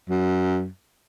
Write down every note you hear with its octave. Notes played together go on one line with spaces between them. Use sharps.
F#2